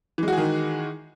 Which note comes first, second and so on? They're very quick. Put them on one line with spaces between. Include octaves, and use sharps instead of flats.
E3 G#3 F#4 G#4 D#3